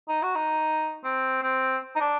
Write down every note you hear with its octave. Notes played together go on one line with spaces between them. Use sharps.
D#4
F#4
D#4
C4
C4
D#4
D4